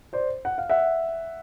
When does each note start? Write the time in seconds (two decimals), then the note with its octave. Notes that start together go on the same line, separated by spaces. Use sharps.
0.13 C5 D5
0.45 F#5
0.58 F5
0.70 E5 F#5